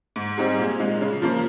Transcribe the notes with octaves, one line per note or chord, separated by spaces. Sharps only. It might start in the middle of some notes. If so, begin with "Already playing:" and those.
G#2
G3 C4 D#4 G#4
A#2
G#3 D#4
C#3
F3 A#3